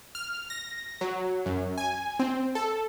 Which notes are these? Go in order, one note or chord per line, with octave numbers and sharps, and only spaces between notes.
F6
A#6
F#3
F#2
G#5
C4
A4